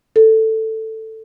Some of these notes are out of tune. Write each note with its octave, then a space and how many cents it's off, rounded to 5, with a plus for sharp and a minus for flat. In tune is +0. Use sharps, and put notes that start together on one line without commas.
A4 +10